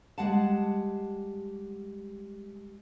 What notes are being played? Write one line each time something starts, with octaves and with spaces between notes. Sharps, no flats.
G3 G#3 G4 F#5 A5